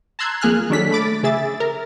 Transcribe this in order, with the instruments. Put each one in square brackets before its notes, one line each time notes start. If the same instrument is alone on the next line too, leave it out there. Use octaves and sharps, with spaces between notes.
[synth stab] A5 A#5 C6 E6 F#6 G#6
F2 A#3 G#4 G#5 F6 F#6
D#3 F#3 D4 A4 B6
A3 B5 D6 A6
C#3 G#4 E5 A6
A#4